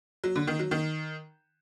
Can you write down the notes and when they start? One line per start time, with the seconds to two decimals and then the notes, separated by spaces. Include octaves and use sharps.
0.24 F#3
0.35 D3
0.47 D#3
0.59 F#3
0.71 D#3